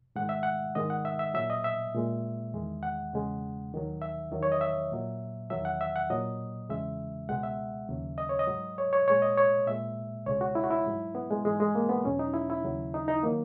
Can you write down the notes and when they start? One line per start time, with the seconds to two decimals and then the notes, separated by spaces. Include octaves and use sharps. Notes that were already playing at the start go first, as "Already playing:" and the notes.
0.16 G#2 D#3 G#3 F#5
0.29 E5
0.43 F#5
0.75 G#2 D#3 G#3 D#5
0.90 F#5
1.05 E5
1.19 E5
1.34 A#2 F#3 E5
1.50 D#5
1.64 E5
1.94 A#2 G#3
2.54 E2 D#3 G#3
2.83 F#5
3.13 E2 C#3 G#3
3.73 D#2 D#3 F#3
4.02 E5
4.31 E2 D#3 F#3
4.43 C#5
4.52 D#5
4.61 E5
4.92 A#2 F#3
5.50 E2 D#3 F#3 E5
5.65 F#5
5.81 E5
5.96 F#5
6.10 A#2 F#3 D#5
6.69 E2 C#3 E3 G#3 E5
7.29 C#2 B2 G#3 F#5
7.43 E5
7.89 D#2 C#3 F#3
8.18 D#5
8.29 C#5
8.39 D#5
8.47 G#2 F#3
8.78 C#5
8.93 C#5
9.08 A#2 G#3 C#5
9.22 D#5
9.37 C#5
9.67 A#2 G#3 E5
10.26 C#2 B2 G#3 C#5
10.41 F#4
10.55 E4
10.64 F#4
10.70 E4
10.86 G#2 F#3
11.15 B3
11.31 G#3
11.45 G#2 E3 G#3
11.60 G#3
11.75 A#3
11.89 B3
12.05 E2 B2 F#3 C#4
12.19 D#4
12.34 E4
12.50 E4
12.64 D#2 C#3 F#3
12.94 D#4
13.08 D#4
13.23 D#3 F#3 A#3